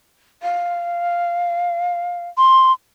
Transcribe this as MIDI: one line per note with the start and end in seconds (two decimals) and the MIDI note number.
0.43 2.29 77
2.38 2.72 84